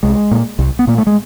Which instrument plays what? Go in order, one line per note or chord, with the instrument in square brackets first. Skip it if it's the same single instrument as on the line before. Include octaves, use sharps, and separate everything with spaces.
[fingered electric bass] C2 G#3
A#2
C2
B3
A#2 A#3
A3
G#3